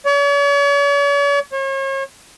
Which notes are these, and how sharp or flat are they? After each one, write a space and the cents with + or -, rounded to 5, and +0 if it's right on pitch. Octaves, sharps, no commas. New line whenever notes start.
C#5 +45
C#5 -40